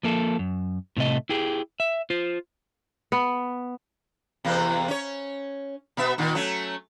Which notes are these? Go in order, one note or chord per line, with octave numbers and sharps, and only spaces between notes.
F3 A#3 A4
F#2
A2 C3 A3 D#5
E4 G4 G#4
E5
F4 C5
B3
E2 C3 A#3
C#4 C#5
B2 B3 E5
A#2 D#3
F#3 A3 C#4